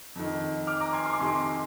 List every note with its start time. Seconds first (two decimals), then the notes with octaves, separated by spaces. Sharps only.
0.16 F2 D#3
0.67 D6 F6
0.80 A#5 D6
0.93 G#5 C6
1.06 C6
1.13 D6
1.19 F2 C3 D#3 G#5 C6